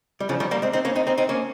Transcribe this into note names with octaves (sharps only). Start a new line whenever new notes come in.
G3
C#3 F3
D#3 G3
G3 A#3
G#3 C4
C4 D#4
A#3 C#4
C4 D#4
C4 D#4
C4 D#4
A#3 C#4